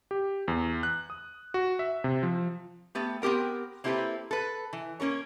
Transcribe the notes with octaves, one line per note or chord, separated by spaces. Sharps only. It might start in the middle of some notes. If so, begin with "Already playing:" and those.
G4
E2
F#6
D#6
F#4
E5
C3
F3
A3 B3 G4
B3 C4 G4 A#4 G5
A#3 C4 E4 G4 A4 B4
A4 B4
E3
A#3 C#4 A#4 C#5